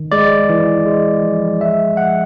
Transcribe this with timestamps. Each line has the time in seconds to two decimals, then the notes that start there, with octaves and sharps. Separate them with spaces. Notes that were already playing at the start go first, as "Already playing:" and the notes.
Already playing: D#3
0.12 G#3 D5
0.49 E3
0.86 G#3
1.23 F3
1.61 G#3 E5
1.97 F3 F#5